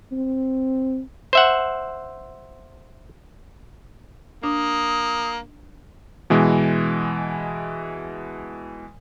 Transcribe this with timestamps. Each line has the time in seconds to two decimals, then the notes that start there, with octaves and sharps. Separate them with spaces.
0.12 C4
1.33 C5 E5 F#5
4.44 A#3 D4 D#6
6.30 B2 E3 G#3